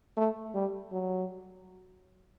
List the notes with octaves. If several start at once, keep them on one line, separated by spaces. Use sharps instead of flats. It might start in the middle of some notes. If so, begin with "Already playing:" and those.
A3
G3
F#3